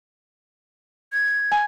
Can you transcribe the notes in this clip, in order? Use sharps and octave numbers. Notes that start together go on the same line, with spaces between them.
G#6
G#5